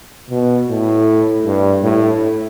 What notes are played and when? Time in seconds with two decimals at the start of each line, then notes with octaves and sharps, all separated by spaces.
0.30 B2
0.69 A2
1.46 G2
1.83 A2